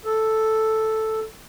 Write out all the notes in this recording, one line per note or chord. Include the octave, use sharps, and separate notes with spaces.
A4